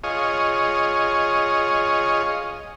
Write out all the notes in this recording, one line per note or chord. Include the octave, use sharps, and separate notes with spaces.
F4 G#4 C#5 D#5